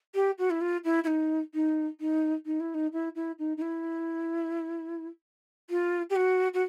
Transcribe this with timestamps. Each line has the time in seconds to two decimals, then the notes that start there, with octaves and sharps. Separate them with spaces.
0.14 G4
0.38 F#4
0.50 E4
0.61 F4
0.84 E4
1.03 E4
1.07 D#4
1.54 D#4
2.00 D#4
2.45 D#4
2.60 E4
2.74 D#4
2.92 E4
3.15 E4
3.39 D#4
3.57 D#4
3.61 E4
5.70 F4
6.09 G4
6.15 F#4
6.53 F#4